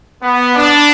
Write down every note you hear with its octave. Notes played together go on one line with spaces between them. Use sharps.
B3
D4